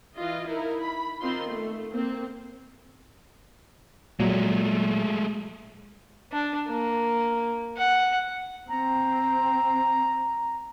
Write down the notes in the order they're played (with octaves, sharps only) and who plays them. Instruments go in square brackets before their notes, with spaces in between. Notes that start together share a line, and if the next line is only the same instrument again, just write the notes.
[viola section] E3 F4 D#5
D#4 E4 A#4
B5
D#3 C4 D#4 F4 C6
A3
A#3 C4
[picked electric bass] A#2 F#3 [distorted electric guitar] G#3 A3
[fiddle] D4
A#3
F#5
[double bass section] C4 [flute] A#5